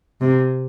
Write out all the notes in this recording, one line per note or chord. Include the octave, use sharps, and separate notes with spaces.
C3